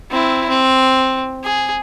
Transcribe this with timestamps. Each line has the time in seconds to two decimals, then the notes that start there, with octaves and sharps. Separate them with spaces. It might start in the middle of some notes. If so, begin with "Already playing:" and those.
0.11 C4 E4
0.50 C4
1.44 G#4